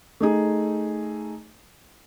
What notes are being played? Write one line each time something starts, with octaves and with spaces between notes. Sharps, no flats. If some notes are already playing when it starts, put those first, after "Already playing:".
A3 D#4 G#4